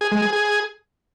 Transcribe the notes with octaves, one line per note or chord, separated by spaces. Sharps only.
G#4
G#3
G#4
G#4